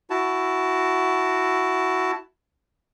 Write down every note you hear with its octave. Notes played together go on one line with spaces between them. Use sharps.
E4 F#4 A5